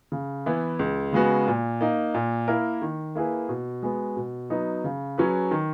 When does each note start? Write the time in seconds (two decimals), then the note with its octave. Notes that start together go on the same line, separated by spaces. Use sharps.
0.12 C#3
0.46 E3 B3 E4
0.79 C#2
1.13 C#3 G#3 B3 F#4
1.47 A#2
1.81 A#3 D#4
2.14 A#2
2.48 A#3 E4 A#4
2.82 D#3
3.15 A#3 E4 G#4 B4
3.49 B2
3.83 G#3 B3 F#4
4.17 B2
4.50 F#3 B3 D#4
4.84 C#3
5.18 F#3 C#4 G#4 B4
5.51 D#3